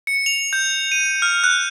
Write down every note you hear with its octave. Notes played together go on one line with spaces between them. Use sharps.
C#7
F7
G6
D#7
F6
F#6